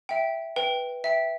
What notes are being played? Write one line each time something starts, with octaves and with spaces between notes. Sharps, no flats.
E5 G5
B4 G5
E5 G5